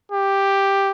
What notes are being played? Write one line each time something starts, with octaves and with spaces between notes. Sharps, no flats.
G4